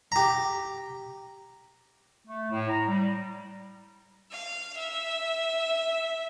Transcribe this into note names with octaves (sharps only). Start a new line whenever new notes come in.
G4 A#5
A3
A2
A#5
G3
F5
E5